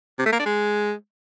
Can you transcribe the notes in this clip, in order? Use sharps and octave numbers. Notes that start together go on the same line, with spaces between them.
C3
A3
A#3
D4
G#3